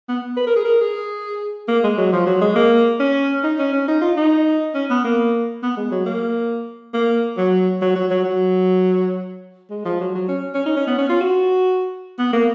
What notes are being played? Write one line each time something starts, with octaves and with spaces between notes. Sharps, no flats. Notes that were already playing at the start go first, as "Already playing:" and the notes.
B3
B4
A#4
G#4
A#4
G#4
A#3
G#3
F#3
F3
F#3
G#3
A#3
C#4
D#4
C#4
C#4
D#4
F4
D#4
C#4
B3
A#3
B3
G#3
F#3
A#3
A#3
F#3
F#3
F#3
F#3
F#3
G#3
F3
F#3
F#3
C#4
C#4
D#4
C#4
B3
C#4
F4
F#4
B3
A#3